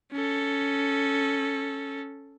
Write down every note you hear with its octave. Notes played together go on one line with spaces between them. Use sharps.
C#4 A4